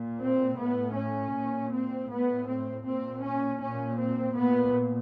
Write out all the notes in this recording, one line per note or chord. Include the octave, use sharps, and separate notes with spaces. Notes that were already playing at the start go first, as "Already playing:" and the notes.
Already playing: A#2
C4
A2 B3
C#4
A#2
C4
A2 B3
C4
A#2 C4
C#4
A#2 C#4
C4
A#2 B3